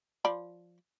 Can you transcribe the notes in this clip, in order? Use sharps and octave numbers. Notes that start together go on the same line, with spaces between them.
F3 D5 B5